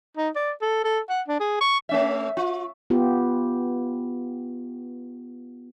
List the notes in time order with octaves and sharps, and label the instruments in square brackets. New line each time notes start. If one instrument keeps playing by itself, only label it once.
[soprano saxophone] D#4
D5
A4
A4
F#5
D4
G#4
C#6
[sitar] A3 C#4 E5
F4
[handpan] B3 F4 G4